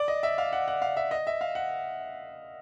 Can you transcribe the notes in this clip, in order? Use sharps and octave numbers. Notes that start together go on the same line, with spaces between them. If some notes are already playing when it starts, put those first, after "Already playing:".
Already playing: D5
D#5
E5
F5
F#5
F#5
F5
E5
D#5
E5
F5
F#5